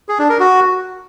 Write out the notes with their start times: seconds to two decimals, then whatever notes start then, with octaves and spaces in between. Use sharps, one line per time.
0.09 G#4
0.19 D4
0.29 A#4
0.40 F#4